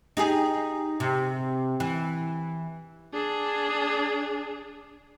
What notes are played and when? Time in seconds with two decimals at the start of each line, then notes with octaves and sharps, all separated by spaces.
0.17 D#4 G4 G#4
1.00 C3
1.80 E3
3.13 D4 G#4